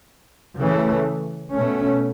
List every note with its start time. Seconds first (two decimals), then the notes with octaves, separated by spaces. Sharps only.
0.59 C#3 E3 A3
1.54 B2 A3 C#4